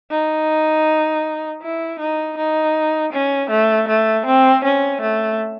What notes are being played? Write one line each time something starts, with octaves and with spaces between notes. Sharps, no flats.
D#4
E4
D#4
D#4
C#4
A3
A3
C4
C#4
A3